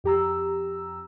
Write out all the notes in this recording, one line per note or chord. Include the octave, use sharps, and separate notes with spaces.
F2 G4 A#5 E6